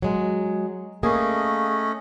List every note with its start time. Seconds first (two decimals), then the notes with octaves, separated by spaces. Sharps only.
0.02 F#3 G#3
1.03 A3 A#3 C#4 G#4 D#5